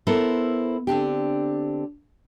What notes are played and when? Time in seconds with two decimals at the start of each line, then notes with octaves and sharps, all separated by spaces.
0.07 B3 E4 A4 A#4 C5
0.87 D3 C4 D4 G4